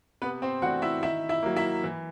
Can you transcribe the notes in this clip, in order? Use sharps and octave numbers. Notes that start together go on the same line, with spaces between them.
C3 B3 B4
C4 C5
E3 A3 D4 F#4 F#5
E4 E5
D#3 E4 E5
E4 E5
F#3 A#3
E4 E5
E3